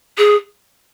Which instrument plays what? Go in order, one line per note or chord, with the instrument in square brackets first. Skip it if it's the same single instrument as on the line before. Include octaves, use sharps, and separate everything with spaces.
[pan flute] G#4